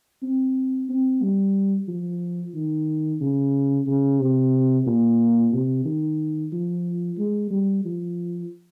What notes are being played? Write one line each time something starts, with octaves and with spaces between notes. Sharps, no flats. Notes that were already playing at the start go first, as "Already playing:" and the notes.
C4
C4
G3
F3
D#3
C#3
C#3
C3
A#2
C3
D#3
F3
G#3
G3
F3